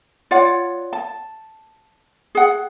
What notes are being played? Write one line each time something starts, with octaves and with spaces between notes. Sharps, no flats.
F4 C#5 D5 F#5
A5
G#4 F#5